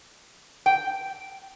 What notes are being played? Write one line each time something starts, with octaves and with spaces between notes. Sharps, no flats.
G5